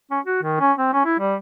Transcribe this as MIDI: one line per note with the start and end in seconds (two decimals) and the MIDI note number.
0.11 0.20 61
0.25 0.39 66
0.43 0.58 51
0.61 0.72 61
0.78 0.91 60
0.94 1.03 61
1.06 1.19 64
1.19 1.35 55